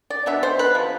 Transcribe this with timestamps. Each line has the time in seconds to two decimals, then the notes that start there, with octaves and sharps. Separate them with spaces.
0.10 D5
0.26 B2 B3 D4 E5
0.43 C5
0.59 B4
0.74 C3 F3